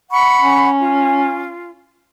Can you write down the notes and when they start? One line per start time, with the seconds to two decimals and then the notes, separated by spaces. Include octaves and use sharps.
0.10 F#5 B5 C#6
0.41 C#4
0.79 F4